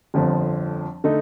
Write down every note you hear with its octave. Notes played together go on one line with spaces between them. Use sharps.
G1 F2 D3 F3
D3 A3 D#4